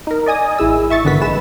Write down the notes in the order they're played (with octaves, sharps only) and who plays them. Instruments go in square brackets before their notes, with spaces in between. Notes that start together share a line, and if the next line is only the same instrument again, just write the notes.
[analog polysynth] D#4 A#4
D5 D#5 G#5 D#6
A1 E4 G#4 E6
E5 C#6 A6
G#1 D3 D#3 B3 F#4 B6
A#1 G#3 B4 E7